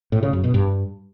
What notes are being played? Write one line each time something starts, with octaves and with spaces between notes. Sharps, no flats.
A2
C#3
F#2
B2
G2